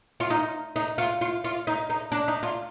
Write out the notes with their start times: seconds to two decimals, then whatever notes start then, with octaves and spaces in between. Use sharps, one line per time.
0.20 F4
0.30 D#4
0.76 D#4
0.98 F4
1.21 F4
1.44 F4
1.67 D#4
1.90 D#4
2.12 D4
2.28 D#4
2.43 F4